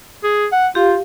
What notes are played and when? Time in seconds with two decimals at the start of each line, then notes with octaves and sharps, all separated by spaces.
0.24 G#4
0.52 F#5
0.75 F4 G4 F5